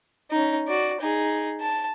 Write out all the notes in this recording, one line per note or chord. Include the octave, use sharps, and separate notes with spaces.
C#4 D#4
F#4 D5
D#4 G#4
A5